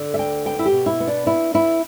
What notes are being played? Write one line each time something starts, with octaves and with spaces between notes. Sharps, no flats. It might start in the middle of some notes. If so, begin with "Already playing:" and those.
Already playing: D3
E5
D2 G5
B3 G5
E4
G4
B2
E4
B3
D4
B3 E4
B3 E4